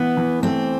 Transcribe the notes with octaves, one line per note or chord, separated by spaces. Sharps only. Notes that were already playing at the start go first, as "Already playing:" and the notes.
Already playing: E3 B3
E3
A3 C4